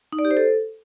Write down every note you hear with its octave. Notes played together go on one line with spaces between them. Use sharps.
D#4
D5
G4
C5
A4